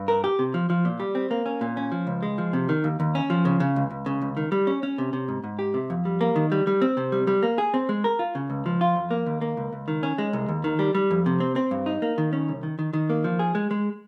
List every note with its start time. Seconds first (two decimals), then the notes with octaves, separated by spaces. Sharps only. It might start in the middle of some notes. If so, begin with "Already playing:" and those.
Already playing: G2
0.08 A#4
0.24 G4
0.39 C3
0.54 F3
0.70 F3
0.85 A#2
1.00 G3
1.15 C4
1.31 A#3
1.46 C#4
1.61 A#2
1.77 C#4
1.92 F3
2.07 C#2
2.23 G#3
2.38 F3
2.53 C3
2.69 D#3
2.84 D#2
3.00 D#2
3.15 C#4
3.30 F3
3.45 C#3
3.60 C#3
3.76 C#2
3.91 C#2
4.06 C#3
4.22 C#2
4.37 D#3
4.52 G3
4.67 C#4
4.83 C#4
4.98 C3
5.13 C3
5.28 G#2
5.44 G#2
5.59 G4
5.74 C3
5.90 F2
6.05 G3
6.21 A#3
6.36 D#3
6.52 G3
6.67 G3
6.82 C4
6.97 C3
7.12 G3
7.27 G3
7.43 A#3
7.58 G#4
7.74 C4
7.89 G#3
8.04 A#4
8.19 F4
8.35 C#3
8.50 C#2
8.66 F3
8.81 F4
8.96 F2
9.11 A#3
9.26 D#2
9.41 A#3
9.57 C#2
9.73 C#2
9.88 D#3
10.03 C#4
10.18 G#3
10.33 C2
10.48 D#2
10.64 D#3
10.79 G3
10.95 G3
11.11 F2
11.26 C3
11.40 C4
11.56 C4
11.71 G2
11.86 D#4
12.02 A#3
12.18 D#3
12.33 C#4
12.48 C2
12.63 D#3
12.79 D#3
12.93 D#3
13.10 A#3
13.24 F3
13.39 G#4
13.55 G#3
13.71 G#3